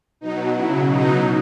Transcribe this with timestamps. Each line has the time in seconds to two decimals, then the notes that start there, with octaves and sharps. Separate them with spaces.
0.21 B2 F#3 D#4
0.55 C#3 F#3 E4
0.89 B2 F#3 D#4